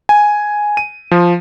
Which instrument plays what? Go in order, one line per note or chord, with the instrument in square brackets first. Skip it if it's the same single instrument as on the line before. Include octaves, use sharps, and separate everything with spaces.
[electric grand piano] G#5
D#7
F3